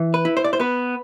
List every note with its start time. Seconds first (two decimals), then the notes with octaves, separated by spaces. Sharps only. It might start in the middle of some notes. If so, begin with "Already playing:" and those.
Already playing: E3
0.14 B4
0.25 E4
0.37 C5
0.44 D5
0.53 C5
0.60 B3 B4